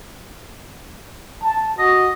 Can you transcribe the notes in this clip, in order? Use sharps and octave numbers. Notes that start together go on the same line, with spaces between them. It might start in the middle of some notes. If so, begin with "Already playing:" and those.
A5
F#4 D#5